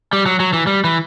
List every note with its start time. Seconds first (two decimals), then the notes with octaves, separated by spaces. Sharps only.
0.13 G3
0.26 F#3
0.40 F#3
0.53 E3
0.67 G3
0.84 E3